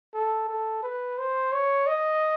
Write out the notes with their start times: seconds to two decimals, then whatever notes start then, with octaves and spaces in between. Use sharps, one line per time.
0.14 A4
0.49 A4
0.83 B4
1.18 C5
1.52 C#5
1.87 D#5